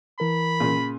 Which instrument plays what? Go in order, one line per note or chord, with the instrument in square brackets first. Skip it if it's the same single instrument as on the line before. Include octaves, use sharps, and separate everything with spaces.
[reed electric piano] E3 A#4 [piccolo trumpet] B5
[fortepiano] A#2 C#3